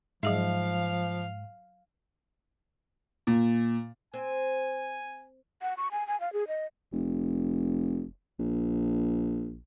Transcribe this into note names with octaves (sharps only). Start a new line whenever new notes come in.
G#2 F3 F#3 G#4 E5 F5
A#2
C4 G#5
F#5
C#6
G#5
G#5
F5
G#4
D#5
F1
A#1